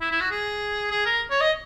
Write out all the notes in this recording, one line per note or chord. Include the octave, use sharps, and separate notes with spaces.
E4
E4
F#4
G#4
G#4
A#4
C#5
D#5